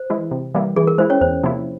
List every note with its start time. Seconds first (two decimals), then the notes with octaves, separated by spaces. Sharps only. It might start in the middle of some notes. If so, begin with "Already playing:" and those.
Already playing: C5
0.10 E3 G#3 E4
0.31 C3
0.54 E3 G3 A#3 E4
0.76 E3 G#4
0.87 A#4
0.98 G#3 E4 C5
1.10 C#4 C#5
1.21 E2 C5
1.44 C3 F3 A#3 E4